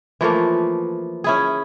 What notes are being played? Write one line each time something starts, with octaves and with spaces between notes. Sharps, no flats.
E3 F3 A3 A#3
C#4 E4 G#4